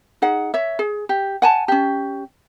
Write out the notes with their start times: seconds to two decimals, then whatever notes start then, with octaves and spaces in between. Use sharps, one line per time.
0.22 D#4 G#4 F#5
0.54 C#5 E5
0.79 G#4
1.09 G4
1.42 F#5 G#5 A5
1.68 C#4 G4